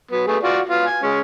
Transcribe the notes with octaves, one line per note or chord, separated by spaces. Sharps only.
F#3 B3
A3 B3 G#4
F4 F#4 D5
B3 F4
G#5
G#3 C#4